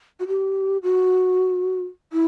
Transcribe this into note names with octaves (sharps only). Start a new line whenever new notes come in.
F#4
G4
F#4
E4